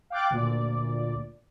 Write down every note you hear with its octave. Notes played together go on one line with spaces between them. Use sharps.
F5 G5 D6 F#6 A6
D2 A#2 D5